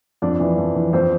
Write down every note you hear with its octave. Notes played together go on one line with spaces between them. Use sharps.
F2 D4 D5
E3
F2
E3
F2 C4 C5